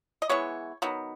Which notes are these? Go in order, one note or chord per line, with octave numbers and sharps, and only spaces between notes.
D#5
E3 G#3 B3 C#5
D#3 F#3 B3